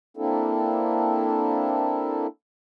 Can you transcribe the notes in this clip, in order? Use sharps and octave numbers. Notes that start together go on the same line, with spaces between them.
A#3 C4 D4 E4 A4